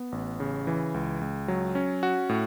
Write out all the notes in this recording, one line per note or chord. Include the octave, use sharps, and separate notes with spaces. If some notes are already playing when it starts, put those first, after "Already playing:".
Already playing: B3
A1
C#3
E3
C#2
C#2
F#3
C#4
F#4
A2